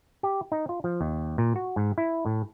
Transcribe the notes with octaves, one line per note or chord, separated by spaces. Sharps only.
G4
D#4
F4
F3
D#2
A#2
F#4
G#2
E4
A2